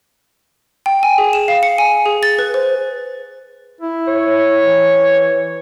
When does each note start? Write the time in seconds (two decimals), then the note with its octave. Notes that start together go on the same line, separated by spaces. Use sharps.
0.86 G5
1.03 G#5
1.18 G#4
1.33 E7
1.48 F5
1.63 C#7
1.78 G#5
2.06 G#4
2.23 A6
2.39 B4
2.54 C5
3.81 E4
4.08 C#5
4.63 E3